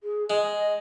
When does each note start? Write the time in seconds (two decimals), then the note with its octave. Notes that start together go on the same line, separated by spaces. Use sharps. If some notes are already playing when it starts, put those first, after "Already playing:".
0.03 G#4
0.30 G#3 D#5